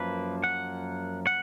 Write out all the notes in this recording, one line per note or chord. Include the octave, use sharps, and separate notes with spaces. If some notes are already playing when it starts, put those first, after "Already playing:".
Already playing: F#2 F3 A#3 B4
F#5
F#5